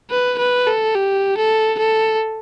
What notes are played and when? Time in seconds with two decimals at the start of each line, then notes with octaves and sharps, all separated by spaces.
0.11 B4
0.39 B4
0.67 A4
0.95 G4
1.37 A4
1.79 A4